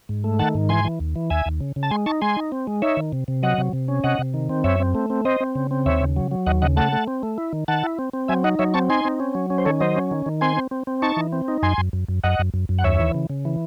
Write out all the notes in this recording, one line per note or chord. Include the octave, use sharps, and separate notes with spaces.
G#2
A3
D#3 F#5 A5
G#2
E3 G#5 C6
E3
D#2
E3
D#2 E5 G#5
D#2
C#3
C#3
A5
G#3 G#5 C6
D#4 A5 C#6
G#3 G#5 C6
D#4
C4
G#3
D#4 C#5 E5
D#3
C3
C3
F#3 D#5 F#5
C3
C3
C#4
C3 D#5 F#5
C3
D#3
C4
F#2 C#5 E5
C4
A3
C4
C4 C5 D#5
C4
C#3
C4
D#2 C#5 E5
C#3
F#3
F#3
D#2 D#5 F#5
C#3 D#5 F#5
A3 F#5 A5
A3
C4
A3
E4
D#3
D#3 F#5 A5
E4
C4
C4
F#3 E5 G#5
D#4 D#5 F#5
F#3 C#5 E5
C4 A5 C#6
D#4 G#5 C6
C4
C#4
F#3
C#4
C5
D#3 A4 C#5
F#3 C5 D#5
C#4
D#3
D#3
C4 G#5 C6
C4
C4
C4
D#4 A5 C#6
E3
C4
D#4
F#2 G#5 C6
F#2
F#2
F#2
F#2 D#5 F#5
F#2
F#2
F#2
F#5
D#2 C#5 E5
E3
C#3
C#3
E3